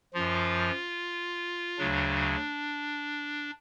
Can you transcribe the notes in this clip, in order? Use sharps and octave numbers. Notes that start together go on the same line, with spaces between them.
F#2 F3 F4
D2 C#3 F#3 D4